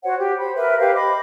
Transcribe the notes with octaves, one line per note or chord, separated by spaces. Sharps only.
F#4 C5 C#5 F#5
G4
C5 B5
A#4 B4 E5
G4 B4 C5 F5
D#5 B5 D6